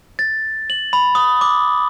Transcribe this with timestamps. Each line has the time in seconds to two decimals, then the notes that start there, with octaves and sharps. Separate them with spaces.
0.19 A6
0.70 F#7
0.93 B5
1.15 D#6
1.41 D6